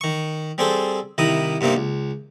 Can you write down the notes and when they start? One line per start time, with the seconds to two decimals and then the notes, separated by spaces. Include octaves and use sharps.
0.01 D#3 C#6
0.58 G3 C4 G#4 A4 C5
1.18 C2 D#3 E4 A#5 D#6
1.61 G2 C3 A#3 C4 D#4
1.77 C#2